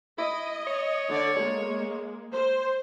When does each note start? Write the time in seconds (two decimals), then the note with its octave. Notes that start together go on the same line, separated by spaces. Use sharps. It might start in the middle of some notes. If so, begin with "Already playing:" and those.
0.19 E4 D#5
0.67 C#5
1.09 D3 D5
1.39 G#3 A#3
2.33 C5